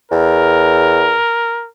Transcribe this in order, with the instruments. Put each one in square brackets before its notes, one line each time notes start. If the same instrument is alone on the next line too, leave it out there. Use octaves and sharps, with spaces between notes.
[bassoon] E2 [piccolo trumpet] A#4